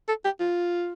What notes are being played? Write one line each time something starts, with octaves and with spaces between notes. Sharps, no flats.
A4
G4
F4